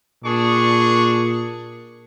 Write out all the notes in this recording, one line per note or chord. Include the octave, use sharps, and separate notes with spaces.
A#2 D4 G#4 C#6